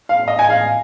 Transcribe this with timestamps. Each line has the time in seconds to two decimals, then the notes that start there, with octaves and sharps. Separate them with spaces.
0.09 F5
0.28 D#5
0.39 G#5
0.50 F5